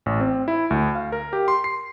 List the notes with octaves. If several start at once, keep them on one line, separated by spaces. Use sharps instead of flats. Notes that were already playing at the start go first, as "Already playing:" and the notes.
A1
C4
E4
D2
F5
A#4
G4
C6
C7